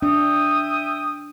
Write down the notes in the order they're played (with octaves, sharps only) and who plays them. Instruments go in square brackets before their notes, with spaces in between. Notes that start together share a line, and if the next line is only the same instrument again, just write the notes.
[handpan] D4 [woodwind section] E5 G5 D#6